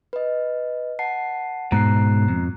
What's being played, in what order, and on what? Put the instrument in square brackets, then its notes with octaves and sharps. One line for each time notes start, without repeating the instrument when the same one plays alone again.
[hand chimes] B4 D#5
F#5 A5 C7
[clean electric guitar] G#2 B2 [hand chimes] A#5 F#6 C7
[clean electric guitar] F2